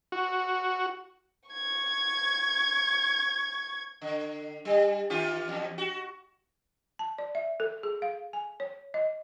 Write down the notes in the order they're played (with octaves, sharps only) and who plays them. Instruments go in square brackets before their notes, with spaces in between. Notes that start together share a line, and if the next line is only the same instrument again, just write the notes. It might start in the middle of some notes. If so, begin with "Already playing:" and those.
[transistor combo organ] F#4
[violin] C#6 G#6
[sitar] D3
G3
D#3 F4 G4
E2
F#4
[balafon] A5
D5
E5
A4
G#4
F5
G#5
C#5
D#5